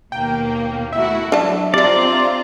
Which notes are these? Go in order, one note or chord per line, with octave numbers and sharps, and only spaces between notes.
D#2 B2 A#3 G5
A3 E4 F#4 E5
F#3 D4 A5
G3 C4 D4 F4 D5 A#5